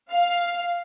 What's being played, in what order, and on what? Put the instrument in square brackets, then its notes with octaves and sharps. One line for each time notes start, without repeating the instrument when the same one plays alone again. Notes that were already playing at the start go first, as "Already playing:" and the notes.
[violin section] F5